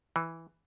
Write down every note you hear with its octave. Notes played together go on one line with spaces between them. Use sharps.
E3